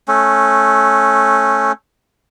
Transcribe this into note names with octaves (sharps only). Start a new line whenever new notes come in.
A3 C#4